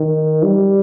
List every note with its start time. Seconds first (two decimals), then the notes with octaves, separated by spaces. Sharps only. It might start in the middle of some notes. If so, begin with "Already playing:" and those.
Already playing: D#3
0.44 G3